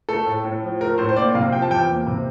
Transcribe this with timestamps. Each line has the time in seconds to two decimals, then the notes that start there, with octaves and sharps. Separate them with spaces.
0.09 A3 A4
0.26 A2
0.44 A2
0.63 F3
0.81 A3 A#4
0.98 A2 C5
1.09 C5
1.16 A#3 D5
1.35 C3 F5
1.52 F3 G5
1.62 A5
1.71 E2 G5
1.89 A#3
2.07 C3